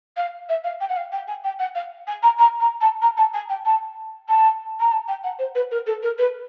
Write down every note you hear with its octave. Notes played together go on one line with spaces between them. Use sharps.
F5
E5
F5
G5
F#5
F5
G5
G#5
G5
F#5
F5
G#5
A#5
A#5
A#5
A5
A#5
A5
G#5
G5
A5
A5
A#5
A5
G5
F#5
C5
B4
A#4
A4
A#4
B4